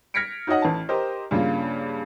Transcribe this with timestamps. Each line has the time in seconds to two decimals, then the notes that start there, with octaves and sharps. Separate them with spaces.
0.14 F6 G#6 A#6 B6 C#7 D7
0.47 D#4 F#4 C#5 D#5 F#5
0.62 A1 A5
0.89 G4 A#4 C5 D#5
1.31 G2 C#3 A#3 F4